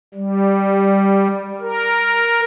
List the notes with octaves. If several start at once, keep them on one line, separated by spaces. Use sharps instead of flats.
G3
A#4